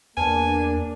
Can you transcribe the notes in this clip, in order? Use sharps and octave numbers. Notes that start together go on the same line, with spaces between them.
E2 A#3 D4 B4 G#5 A5